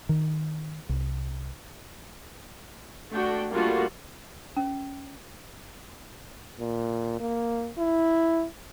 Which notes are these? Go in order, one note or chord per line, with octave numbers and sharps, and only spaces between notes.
D#3
C2
A3 D4 F#4 G5
G3 A3 A#3 D4 F4 F#4
C#4
A#2
A#3
E4